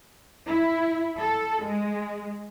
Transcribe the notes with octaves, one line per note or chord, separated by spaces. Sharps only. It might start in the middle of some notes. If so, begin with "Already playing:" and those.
E4
A4
G#3